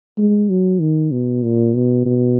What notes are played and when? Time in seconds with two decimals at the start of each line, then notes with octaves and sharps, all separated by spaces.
0.18 G#3
0.50 F#3
0.81 D#3
1.11 B2
1.43 A#2
1.75 B2
2.06 B2